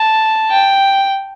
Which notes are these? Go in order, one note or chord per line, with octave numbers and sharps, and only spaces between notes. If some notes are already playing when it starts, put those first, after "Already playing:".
Already playing: A5
G5